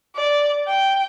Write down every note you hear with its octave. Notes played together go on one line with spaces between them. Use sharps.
D5
G5